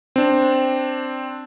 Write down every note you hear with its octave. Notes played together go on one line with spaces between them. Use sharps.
C4 D4